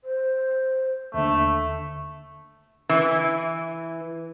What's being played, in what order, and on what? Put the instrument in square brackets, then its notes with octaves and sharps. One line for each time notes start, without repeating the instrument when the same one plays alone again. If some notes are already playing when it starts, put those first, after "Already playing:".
[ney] C5
[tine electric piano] D#2 D3 [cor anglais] A3 [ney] E5
[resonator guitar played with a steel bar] E3